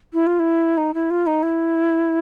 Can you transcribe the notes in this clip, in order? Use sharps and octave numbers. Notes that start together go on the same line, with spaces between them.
E4
F4
E4
D#4
E4
F4
D#4
E4